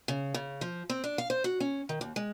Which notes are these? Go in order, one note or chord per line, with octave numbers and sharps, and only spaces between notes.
C#3
C#3
F3
C4
D4
F5
C5
F#4
C#4
D#3
D#2
G#3